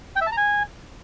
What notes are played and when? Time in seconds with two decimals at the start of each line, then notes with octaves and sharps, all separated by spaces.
0.16 G5
0.21 E5
0.27 A5
0.32 A#5
0.37 G#5